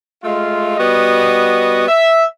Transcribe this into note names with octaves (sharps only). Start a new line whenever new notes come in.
G#3 A3 F4
G3 B3 F#4 D#5
E5